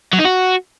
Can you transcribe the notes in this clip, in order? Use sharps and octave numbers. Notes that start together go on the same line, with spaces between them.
F#3
D#4
F#4